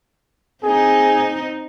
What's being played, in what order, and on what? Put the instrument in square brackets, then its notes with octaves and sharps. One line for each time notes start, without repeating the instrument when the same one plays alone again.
[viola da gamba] C4 D#4 [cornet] G#4